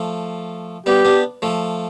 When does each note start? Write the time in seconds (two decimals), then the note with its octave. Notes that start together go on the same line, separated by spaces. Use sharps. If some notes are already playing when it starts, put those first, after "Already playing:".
Already playing: F3 A3
0.86 G3 B3 G4
1.05 B3 D4
1.42 F3 A3